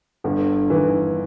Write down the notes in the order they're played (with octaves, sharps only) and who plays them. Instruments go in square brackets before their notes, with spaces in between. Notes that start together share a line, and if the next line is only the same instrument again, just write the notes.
[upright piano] G1 [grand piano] D3
[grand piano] D#3 [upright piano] E3